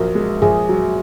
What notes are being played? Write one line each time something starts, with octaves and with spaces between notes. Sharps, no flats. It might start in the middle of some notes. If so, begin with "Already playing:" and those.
Already playing: A#1 F#3 A#4
G#3
A#1 G#4
F#3